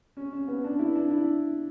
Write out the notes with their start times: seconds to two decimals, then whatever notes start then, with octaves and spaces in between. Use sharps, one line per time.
0.17 C#4
0.33 C#4
0.48 B3
0.64 D4
0.79 E4
0.95 D4
1.11 E4